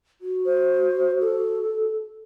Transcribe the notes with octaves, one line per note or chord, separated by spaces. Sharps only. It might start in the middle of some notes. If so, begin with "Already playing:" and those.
F#4
C5
A4